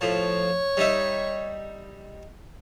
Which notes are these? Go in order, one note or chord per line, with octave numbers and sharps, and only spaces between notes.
A2 F3 C#5
G3 D#4 E5